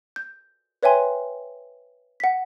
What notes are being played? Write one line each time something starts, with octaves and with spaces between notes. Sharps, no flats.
G6
B4 C#5 E5 G5 G#5 C6
F#5 B6